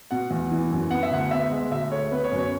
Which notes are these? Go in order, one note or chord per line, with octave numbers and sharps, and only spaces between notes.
B2 F#5
E2
E3
F#2
B3 F#5
E5
D2 F#5
B3 E5
G#3
D2 E5
A3 C#5
B3 B4
C#5
F#2
C#5